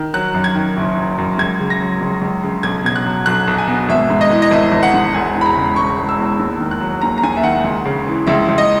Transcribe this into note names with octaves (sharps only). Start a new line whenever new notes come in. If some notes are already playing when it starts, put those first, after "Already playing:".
Already playing: D#3
F#3 F#6
F#2
G#6
D#3
F#1
F#3
F#2
C#2 G#6
C#3
A#6
F#3
C#2
C#2
C#3
B1 G#6
B2 G#6
F#6
F#3
B1 F#6
B1
G#5
B2
G#1 E5
G#2
D#5
E3
D#5
G#1 E5
G#1
F#5
G#2
E1 G#5
E2
B5
A#5
C#3
E1 C#6
E1
E6
E2
D#2
D#3
F#6
F#3
D#2 A#5
A#5
D#2 G#5
E5
D#3 F#5
C#2
C#3
E3
C#2 E5
C#2
D#5